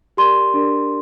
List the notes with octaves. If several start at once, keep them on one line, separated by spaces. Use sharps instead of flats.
G4 A#4 D5 C6
D4 G4 A#4 D5